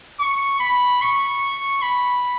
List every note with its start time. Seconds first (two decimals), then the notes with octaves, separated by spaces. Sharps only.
0.20 C#6
0.60 B5
1.02 C#6
1.82 B5